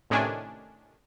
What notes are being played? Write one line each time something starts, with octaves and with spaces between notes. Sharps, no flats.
A2 C3 D#3 C#4 D4 G#5